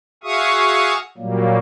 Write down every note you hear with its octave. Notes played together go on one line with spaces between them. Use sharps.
F#4 G#4 E5 F5 C#6 D#6
A#2 F#3 G3 A#3